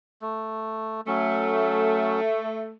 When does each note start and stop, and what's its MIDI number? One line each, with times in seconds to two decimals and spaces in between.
0.22 1.01 57
1.07 2.21 54
1.07 2.73 57
1.07 2.21 61